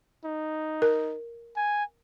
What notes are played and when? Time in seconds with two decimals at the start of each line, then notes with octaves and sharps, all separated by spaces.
0.25 D#4
0.82 A#4
1.56 G#5